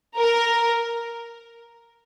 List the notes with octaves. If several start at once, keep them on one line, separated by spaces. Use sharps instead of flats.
A#4